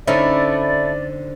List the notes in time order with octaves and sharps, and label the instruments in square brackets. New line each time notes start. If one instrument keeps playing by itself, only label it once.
[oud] D3 C#4 D#4 [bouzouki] A3 E4 [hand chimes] C5 A6 [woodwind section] D5